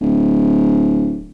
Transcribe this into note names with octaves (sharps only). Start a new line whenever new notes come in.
D1